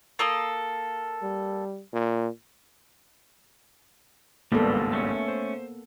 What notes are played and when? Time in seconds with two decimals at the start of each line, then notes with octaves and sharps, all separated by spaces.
0.19 A#3 A4 D#6
1.22 G3
1.93 A#2
4.52 G#1 C#2 G2 G3 A#3 B3 A4
4.93 A3 C#4
5.15 E5
5.28 C5